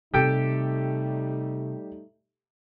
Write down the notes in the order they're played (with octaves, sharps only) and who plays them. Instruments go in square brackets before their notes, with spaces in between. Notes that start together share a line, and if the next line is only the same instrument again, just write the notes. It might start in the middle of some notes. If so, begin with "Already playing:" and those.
[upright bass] C3 [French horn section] G3 A3 D#4 [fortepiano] G4 A4 G5